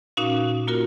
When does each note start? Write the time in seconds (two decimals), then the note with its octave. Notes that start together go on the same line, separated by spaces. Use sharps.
0.17 A#2 C#4 D#4 F#4 F5
0.67 A#3 F4 F#4 A#4